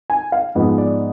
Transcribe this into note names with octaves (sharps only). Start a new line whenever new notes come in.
G#5
F5
G#2 F3 G#3 B3
D5